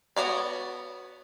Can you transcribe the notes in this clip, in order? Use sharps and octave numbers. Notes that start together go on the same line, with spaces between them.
B3 F#4 C#5 D5